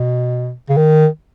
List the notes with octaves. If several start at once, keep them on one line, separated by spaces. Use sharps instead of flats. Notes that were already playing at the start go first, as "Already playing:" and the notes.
Already playing: B2
C#3
D#3